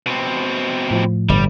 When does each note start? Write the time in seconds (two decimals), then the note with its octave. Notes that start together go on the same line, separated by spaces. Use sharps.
0.07 B2 C4
0.91 A2 F3
1.29 G1 G3